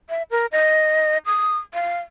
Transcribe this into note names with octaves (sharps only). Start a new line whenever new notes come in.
E5
A#4
D#5
D#6
F5